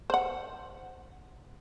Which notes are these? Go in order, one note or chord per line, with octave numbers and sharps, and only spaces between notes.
C5 F#5